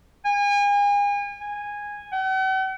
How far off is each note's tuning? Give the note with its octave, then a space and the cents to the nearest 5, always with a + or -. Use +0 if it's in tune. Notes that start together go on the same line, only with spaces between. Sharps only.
G#5 -35
G#5 -10
F#5 +45